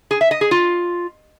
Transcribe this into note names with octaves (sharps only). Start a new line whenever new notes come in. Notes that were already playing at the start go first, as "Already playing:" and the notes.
G#4
E5
D#5
G#4
F4